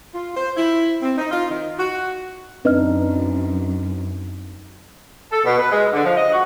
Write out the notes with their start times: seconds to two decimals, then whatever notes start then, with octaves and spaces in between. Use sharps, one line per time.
0.14 F4
0.36 C5
0.56 E4
1.02 C4
1.17 D#4
1.31 F4
1.49 D#3
1.78 F#4
2.65 F#2 C4 D4 D#4 B4 D#5 F6
5.31 A4
5.45 B2
5.59 B4
5.71 G#3
5.93 D3
6.04 F3
6.17 D#5
6.32 F#4